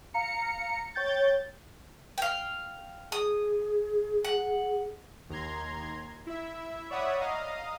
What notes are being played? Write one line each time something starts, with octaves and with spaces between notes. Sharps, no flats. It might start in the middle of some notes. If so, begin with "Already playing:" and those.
F5 A#5 C#7
C#5 G5 G6 A6
F5 G5
G#4 D#6
F#5
D#2 A#5 C6 G#6
E4 E5
C#5 D5 E5 F#5 B5 D#6
D#5 F5 A#5 D#6